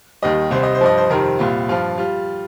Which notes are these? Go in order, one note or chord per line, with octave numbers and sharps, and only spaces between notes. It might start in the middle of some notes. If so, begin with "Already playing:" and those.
D#2 D#3 G3 D#5
C2 C3 G3 C5
D#5
C5
G2 F3 D#5
C5
F2 C3 D#3 G3 A#4
C2 A#2 G3 F4
G2 F3 F4
G3 F4